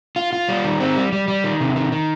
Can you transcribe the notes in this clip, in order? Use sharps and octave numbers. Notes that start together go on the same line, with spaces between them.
F4
F4
G3
D#3
C4
G3
G3
G3
D#3
C3
D#3
D#3